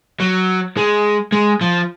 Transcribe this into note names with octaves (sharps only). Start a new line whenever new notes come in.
F#3
G#3
G#3
F3